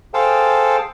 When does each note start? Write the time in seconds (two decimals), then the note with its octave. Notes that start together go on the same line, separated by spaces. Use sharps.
0.14 G#4 A4 C5 F5 G5 A5